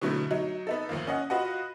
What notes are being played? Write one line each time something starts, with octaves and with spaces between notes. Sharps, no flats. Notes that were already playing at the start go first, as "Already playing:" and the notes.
B2 D3 F#3 A3 B3 E4
F#3 D#4
B3 D#4 A4
A1 D#2 F3 A#3
C#4 D#5 F#5
F4 F#4 B4 D#5 F#5